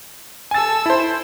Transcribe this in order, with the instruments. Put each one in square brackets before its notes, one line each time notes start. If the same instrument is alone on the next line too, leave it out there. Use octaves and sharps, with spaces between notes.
[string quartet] A4 A5 E6 [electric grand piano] G#5 A6
[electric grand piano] E4 C5